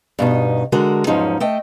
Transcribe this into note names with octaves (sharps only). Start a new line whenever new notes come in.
G2 B2 D#4
D3 G#3 F#4 A#4
E2 G#2 F3 F#3 C#4 D#4
A3 D#5 G5